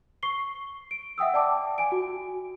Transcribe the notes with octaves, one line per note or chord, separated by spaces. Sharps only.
C#6 C7 G7
D7
E5 F#5 G5 D#6 E6
D5 G5 A5 D6
G#5 D7
F#4